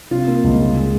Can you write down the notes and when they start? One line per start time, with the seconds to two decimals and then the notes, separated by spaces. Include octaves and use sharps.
0.11 C3 F4
0.27 A#3
0.44 C#2
0.60 G#3
0.76 G#3